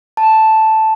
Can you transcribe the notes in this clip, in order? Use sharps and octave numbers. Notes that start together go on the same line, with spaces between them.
A5